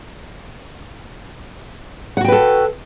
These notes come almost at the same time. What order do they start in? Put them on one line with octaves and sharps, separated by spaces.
F#5 F#4 G5 B4 A4